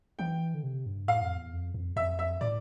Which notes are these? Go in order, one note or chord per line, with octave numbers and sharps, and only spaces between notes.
E3 G5
D3
C3
G2
A2 F5
F2
E2
F2
F2
F2 E5
E5
A2 D5